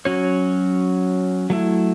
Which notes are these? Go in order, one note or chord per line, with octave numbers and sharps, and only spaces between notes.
F#3 C#4 F#4 C#5
F#3 A3 E4